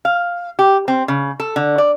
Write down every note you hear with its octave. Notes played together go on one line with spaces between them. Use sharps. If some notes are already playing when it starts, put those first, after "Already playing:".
F5
G4
C4
C#3
A4
D3
D5